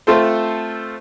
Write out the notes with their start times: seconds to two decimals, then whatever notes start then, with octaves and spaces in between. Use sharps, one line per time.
0.07 A3 C4 F4 A4 C5